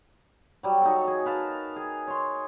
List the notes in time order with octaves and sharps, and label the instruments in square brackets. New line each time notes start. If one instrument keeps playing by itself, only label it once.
[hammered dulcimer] F#3 G3
D#4 F#4 A4
G#4 D#5
A#4 B4 F5 A5
G#4
C#5 C6